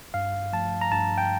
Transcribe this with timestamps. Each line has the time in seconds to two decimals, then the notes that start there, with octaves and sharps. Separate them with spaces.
0.14 G2 F5
0.53 F3 A3 A5
0.81 A#5
0.92 G2 A5
1.18 G5